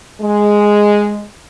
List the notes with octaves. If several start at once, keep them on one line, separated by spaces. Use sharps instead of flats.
G#3